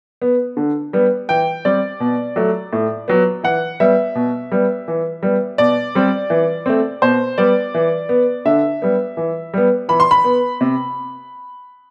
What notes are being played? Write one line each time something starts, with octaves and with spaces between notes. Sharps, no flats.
B3
D3
G3 B3
E3 G5
G3 C4 D5
B2
F#3 A3
A2
F#3 B3
E3 F#5
G3 B3 E5
B2
G3 B3
E3
G3 B3
B2 D5
G3 C4
E3
A3 C4
B2 C5
G3 B3 D5
E3
B3
D3 E5
G3 B3
E3
G3 B3
E3 B5
C6
B5
B3
C3